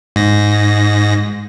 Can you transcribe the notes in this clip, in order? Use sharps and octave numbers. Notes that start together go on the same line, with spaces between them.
G#2 A#6